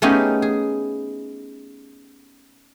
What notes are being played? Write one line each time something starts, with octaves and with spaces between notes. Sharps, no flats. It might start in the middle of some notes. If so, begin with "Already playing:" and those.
A3 B3 C#4 D#4 G4 G#4
G#4